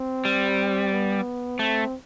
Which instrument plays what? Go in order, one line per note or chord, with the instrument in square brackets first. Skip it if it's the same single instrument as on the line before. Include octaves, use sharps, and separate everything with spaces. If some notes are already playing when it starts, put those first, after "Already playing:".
Already playing: [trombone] C4
[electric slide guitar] G3
[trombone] B3
[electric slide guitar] A3 [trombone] C4